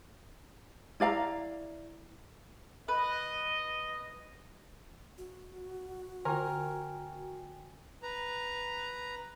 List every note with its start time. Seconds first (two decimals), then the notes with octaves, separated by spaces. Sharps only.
1.00 E4 D5 F5 A#5
2.88 B4 D#5
5.18 F#4
6.25 D3 F4 A#4 G5 G#5
8.03 B4 A#5